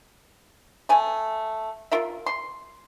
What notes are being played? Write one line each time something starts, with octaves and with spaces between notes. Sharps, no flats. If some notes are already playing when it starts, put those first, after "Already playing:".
A3 G#5
F4 A#4 E5
C6